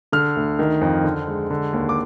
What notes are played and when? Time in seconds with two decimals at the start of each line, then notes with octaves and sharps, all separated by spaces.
0.12 D3 F6
0.36 D2
0.59 D#3
0.81 F2
1.04 D3
1.27 G#3
1.50 D3
1.73 D#2
1.89 D6